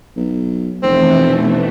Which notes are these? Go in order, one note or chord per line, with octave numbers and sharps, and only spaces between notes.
B1
F1 B2 E3 A3 C4